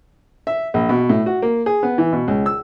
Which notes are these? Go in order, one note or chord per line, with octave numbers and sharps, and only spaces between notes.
E5
A#1
B2
A2
F#4
A#3
G#4
B3
E3
B2
C#2
E6